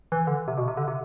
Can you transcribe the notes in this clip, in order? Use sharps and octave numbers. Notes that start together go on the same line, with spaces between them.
E3
D3
C3
B2
C3
D3
C3